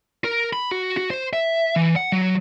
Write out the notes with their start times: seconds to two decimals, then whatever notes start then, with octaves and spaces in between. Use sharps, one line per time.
0.24 A#4
0.53 B5
0.72 F#4
0.97 F#4
1.10 C5
1.33 E5
1.76 E3
1.96 F#5
2.12 F#3